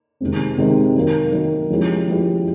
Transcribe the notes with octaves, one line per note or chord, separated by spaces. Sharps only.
C3 D#3 G#3 C4
C3 D#3 G#3 C4
D#3 F#3 A#3
D#3 F#3 A#3
F3 G#3 C#4 E4 G4
F3 G#3 C#4 E4 G4